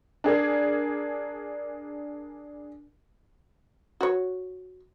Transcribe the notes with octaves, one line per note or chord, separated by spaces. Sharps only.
D4 G#4 A#4
F#4 C#5